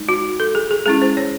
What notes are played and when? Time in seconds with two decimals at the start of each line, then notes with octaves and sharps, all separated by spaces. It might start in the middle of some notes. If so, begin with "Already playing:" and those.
Already playing: G#3 D#4
0.09 F#4
0.40 A4
0.55 G#4
0.71 G#4
0.86 G#3 C#4 E4 G#4
1.02 C5
1.17 C#5